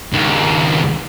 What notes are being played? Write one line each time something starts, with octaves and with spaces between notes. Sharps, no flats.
C#2 D#3